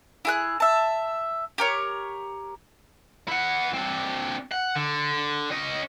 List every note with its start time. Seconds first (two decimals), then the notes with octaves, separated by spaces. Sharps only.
0.25 E4 G#4 F#6
0.60 E5 A5
1.58 G4 A#4 C#5
3.28 E4 F#5
3.73 C4 D4
4.52 F#5
4.76 D3
5.51 C#4 D#5